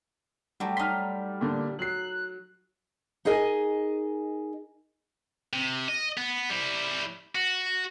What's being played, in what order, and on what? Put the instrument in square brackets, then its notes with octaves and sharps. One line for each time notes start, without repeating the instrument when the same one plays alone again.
[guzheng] F#3 A3 G4 [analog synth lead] G3
[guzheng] D#4 C6 [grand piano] F6 B6
[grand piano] A#2 D3
[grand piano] F#3 C7 [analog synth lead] F#6
[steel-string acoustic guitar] D#4 G#4 A#4 D#5 G#5
[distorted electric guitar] C3
D#5
B3
G3 E4
F#4